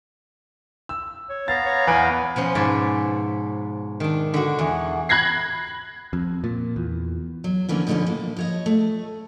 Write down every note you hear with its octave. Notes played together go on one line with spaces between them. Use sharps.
E6
C#5
B3 F5 A#5 A6
C#5
E2 B4 G#5 D7
B2 F3 C#4 C6
G#2 B4 C#5 D5 A5
D#3 D4
D3 F#4
E2
B5 F#6 G#6 A#6 C7
F2
A#2
E2
F#3
D3 E3 F3 A#3 C#4
G#2 B2 D3 E3 F3 C#4
A2 A#3
F3 C#5 D#5
A3